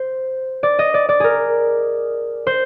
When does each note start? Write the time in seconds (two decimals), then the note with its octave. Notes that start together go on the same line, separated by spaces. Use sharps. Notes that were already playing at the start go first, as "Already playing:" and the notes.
Already playing: C5
0.63 D5
0.79 D#5
0.94 D5
1.09 D5
1.20 G#4 A#4
2.47 C5